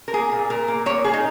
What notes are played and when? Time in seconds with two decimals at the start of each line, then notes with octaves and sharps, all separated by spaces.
0.08 A#4
0.13 A#3 G#4
0.32 A#2
0.50 A#2 A#4
0.68 A#3
0.86 A#3 C#5
1.04 A#2 G#4
1.13 D#4